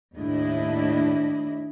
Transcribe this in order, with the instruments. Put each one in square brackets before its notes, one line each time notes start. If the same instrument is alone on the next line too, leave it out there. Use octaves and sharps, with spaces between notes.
[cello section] D#2 A2 D4 E4 D#5